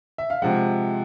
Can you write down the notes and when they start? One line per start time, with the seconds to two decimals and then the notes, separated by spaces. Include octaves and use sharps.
0.18 E5
0.30 F5
0.42 C3 F3 G#3 F#5